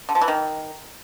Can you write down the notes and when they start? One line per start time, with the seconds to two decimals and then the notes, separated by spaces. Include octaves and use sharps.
0.09 D3
0.15 F3
0.21 E3
0.28 D#3